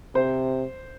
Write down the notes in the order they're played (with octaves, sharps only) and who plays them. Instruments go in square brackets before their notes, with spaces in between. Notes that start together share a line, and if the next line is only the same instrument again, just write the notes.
[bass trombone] C3 [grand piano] C5